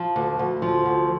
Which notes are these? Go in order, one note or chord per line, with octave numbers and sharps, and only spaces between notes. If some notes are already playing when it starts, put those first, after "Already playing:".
Already playing: F3
D2
D2
F3
D2